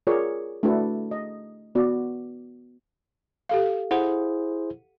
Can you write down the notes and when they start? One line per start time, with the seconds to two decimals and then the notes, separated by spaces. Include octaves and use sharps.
0.07 F4 G#4 A#4 C#5 D5
0.63 A3 D4 E4 F#4 A4 B4
1.11 D#5
1.75 B3 F#4 D5
3.49 G4 A4 F5
3.91 E4 G#4 C5 F#5